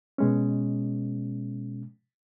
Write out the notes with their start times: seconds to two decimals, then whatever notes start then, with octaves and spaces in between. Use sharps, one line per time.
0.18 B2 G#3 C#4